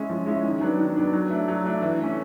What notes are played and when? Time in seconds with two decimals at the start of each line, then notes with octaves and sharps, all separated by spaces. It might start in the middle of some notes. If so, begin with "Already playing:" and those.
Already playing: G#3 C#4 E4
0.09 F3
0.26 G#3 C#4 E4
0.44 D#3
0.61 F#3 B3 D4
0.79 D#3
0.96 F#3 B3 D4
1.13 F#3
1.30 A3 D4
1.48 F#3
1.65 A3 D4
1.82 E3
2.00 A3 C#4